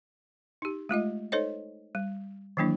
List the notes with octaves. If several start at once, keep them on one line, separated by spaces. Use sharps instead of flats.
D#4 G4
G#3 A3 F4 D#5
D#4 A4 C5 C#5 D#5
G3
D#3 E3 F#3 A#3 D4 E4